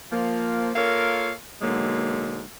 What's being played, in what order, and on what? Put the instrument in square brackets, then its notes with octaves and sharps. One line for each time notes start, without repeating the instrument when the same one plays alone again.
[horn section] F3 A#3
A#3 F4 A4 A#4 C#5 F5
G#2 B2 D3 F#3 G#3 A#3